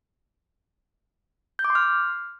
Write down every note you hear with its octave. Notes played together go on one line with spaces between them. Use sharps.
G6
D6
C6
F6